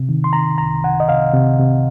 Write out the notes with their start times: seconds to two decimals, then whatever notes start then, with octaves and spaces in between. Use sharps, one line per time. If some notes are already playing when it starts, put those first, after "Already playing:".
Already playing: C3
0.09 D#3
0.24 C6
0.33 D#3 A#5
0.58 C2 A#5
0.83 D#3 F#5
1.00 D#5
1.08 C3 F5
1.33 C3
1.59 C3